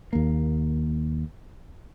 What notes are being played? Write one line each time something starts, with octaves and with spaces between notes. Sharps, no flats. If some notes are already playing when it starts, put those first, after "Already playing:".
D#2 A#3